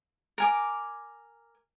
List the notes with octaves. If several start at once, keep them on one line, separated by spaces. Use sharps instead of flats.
A#4 G#5 D6